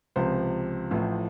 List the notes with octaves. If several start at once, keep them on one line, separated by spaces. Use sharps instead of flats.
C#2 C3 F3 C5
A1 A2 F3